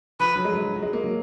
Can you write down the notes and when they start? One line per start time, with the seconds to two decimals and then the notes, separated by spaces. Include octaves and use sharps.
0.20 F3 B4
0.36 F#3
0.45 G#3
0.53 F#3
0.76 F#3
0.82 G#3
0.93 A#3
1.04 F#3